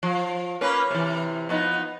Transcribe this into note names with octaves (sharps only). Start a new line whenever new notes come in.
F3
A#3 C#4 B4
C3 E3
F3 B3 D#4